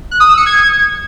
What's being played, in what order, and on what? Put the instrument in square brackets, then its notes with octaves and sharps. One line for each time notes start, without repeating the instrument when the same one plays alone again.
[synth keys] F#6
D#6
E6
C#7
G#6